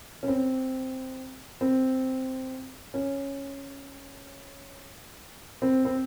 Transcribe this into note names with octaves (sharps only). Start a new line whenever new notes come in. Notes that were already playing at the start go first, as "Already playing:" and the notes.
C#4
C4
C4
C#4
C4
C4